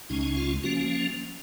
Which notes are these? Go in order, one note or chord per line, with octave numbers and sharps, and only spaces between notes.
C#2 C#3 G#3 C#4 D#4
F4
F3 A#3 C#4 F#4